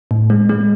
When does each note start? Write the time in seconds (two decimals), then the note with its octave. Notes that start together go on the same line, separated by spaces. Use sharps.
0.11 A2
0.30 G#3
0.49 G#3